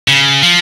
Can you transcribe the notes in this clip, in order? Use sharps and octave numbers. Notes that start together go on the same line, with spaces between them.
C#3
F3